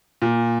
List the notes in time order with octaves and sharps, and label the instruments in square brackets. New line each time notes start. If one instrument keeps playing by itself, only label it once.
[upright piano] A#2